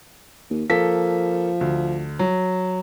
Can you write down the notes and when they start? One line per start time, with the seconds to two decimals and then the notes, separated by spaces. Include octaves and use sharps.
0.50 D#2
0.70 F3 A#3 A4 B6
1.61 D2
2.19 F#3